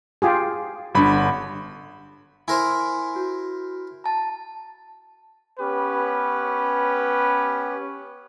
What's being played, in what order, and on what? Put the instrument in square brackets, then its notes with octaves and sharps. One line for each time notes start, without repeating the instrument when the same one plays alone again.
[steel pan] F4 G4 G#4
[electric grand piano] G1 B5 [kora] D3 G3
[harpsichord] E4 A#4 C5 [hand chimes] G#5
[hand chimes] F#4
A5 A#5
[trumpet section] B3 C#4 G4 B4